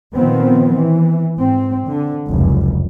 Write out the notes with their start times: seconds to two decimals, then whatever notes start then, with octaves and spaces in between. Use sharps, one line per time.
0.14 A#2 D#3 F3 B3 C4
0.75 E3
1.37 G#2 C4
1.88 D3
2.29 F1 C#2 F#2